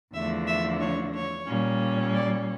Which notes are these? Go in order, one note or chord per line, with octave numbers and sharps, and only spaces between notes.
E2 D3 F3 A3 D4 E5
E5
C#5
C#5
A#2 G3 C#4
D5